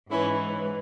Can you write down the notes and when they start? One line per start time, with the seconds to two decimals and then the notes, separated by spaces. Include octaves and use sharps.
0.10 G#2 E3 C#4 E4